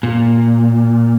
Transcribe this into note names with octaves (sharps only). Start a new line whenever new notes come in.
A#2